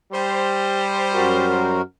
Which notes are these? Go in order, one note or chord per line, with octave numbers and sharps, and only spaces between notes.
G3 C5
F#2 F#4 A#4